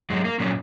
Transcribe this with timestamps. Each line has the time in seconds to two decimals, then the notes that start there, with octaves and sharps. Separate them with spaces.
0.10 F#2 F#3 G#3
0.24 A#3
0.40 A#2 F#3 C#4